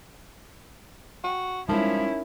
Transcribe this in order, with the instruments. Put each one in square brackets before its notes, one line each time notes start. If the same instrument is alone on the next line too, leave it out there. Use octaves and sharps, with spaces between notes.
[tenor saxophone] F#4 [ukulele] G5
[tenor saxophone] F3 [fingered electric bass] G3 G#3 [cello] C#4 E4 [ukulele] D#4 A#4 A5